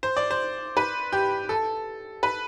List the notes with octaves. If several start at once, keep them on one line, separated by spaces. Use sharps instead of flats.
C5
D5
C5
B4
G4
A4
B4